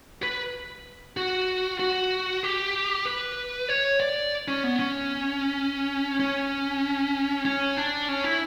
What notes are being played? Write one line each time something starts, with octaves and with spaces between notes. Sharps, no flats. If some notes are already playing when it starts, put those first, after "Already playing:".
B4
F#4
F#4
G4
B4
C#5
D5
C#4
B3
C#4
C#4
C#4
D4
C#4
E4